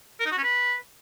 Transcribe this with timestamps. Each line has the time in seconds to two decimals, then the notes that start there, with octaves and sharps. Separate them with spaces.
0.20 A#4
0.26 D#4
0.32 F#4
0.38 C#4
0.43 B4